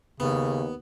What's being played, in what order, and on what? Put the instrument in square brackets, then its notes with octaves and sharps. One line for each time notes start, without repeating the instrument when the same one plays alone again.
[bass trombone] D#2 [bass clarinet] C#3 [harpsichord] B3